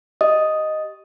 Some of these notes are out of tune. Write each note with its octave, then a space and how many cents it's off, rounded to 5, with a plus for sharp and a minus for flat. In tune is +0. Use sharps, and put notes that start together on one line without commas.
G4 -10 D#5 +0 D#6 +0